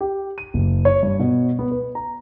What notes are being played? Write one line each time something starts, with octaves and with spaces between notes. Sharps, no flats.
G4
D#7
F#1
C#5
G2
B2
B3
B4
A#5